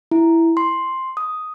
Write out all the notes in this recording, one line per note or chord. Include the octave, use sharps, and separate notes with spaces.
E4
C6
D#6